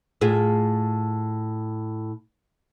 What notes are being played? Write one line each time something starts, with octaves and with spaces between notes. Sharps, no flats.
A2 F4 G#4